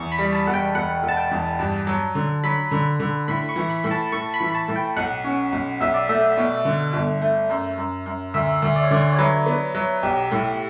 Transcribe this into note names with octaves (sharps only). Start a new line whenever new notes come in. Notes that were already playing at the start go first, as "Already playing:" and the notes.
Already playing: E2 C#6
B5
G3
A5
E1 F#5
G5
E1 F#5
E1
A5
G5
E2
G2 A5
F#3
D3
F#3 B5
D3
D3
A2 B5
C#6
E3
B5
A2
A5
A2 C#6
B5
E3
B5
A5
A2
G5
B1 F#5
C#4
B1
B1 E5
D5
A3 E5
B2
D3
G1
A3
F#2
F#2
F#2
D2 E5
D2
D5
C#5
D3 D5
C#5
F#3 B4
B3
F#3
B1 G4
A2